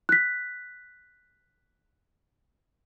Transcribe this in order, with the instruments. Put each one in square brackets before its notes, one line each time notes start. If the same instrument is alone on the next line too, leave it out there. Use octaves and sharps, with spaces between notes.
[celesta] F#6 B6